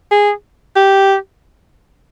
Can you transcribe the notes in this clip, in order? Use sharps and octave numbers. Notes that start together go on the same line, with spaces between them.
G#4
G4